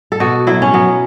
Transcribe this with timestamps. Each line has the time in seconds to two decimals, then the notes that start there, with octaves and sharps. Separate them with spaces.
0.12 A4
0.20 B2 F#4
0.47 F#3 E4
0.62 C#4
0.74 F#3 B3